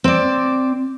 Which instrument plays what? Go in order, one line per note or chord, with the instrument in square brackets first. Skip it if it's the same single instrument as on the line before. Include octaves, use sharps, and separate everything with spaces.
[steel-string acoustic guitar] C4 D5